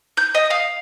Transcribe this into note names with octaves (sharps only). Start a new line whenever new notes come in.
G6
D#5
F5